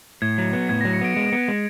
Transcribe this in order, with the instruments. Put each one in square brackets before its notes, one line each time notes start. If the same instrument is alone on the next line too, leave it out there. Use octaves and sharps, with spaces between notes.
[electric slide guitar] A2 [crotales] G#6
[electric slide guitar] F#3
B3
[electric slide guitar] A2 [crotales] G#6
[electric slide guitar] F#3 [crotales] A#6
[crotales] C#7
[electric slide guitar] B3 [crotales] D7
[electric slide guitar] G#3 [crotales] D7
[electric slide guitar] B3
G#3